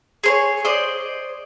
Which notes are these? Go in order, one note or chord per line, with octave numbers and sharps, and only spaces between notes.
G#4 C5 C#5
C5 D5 D#5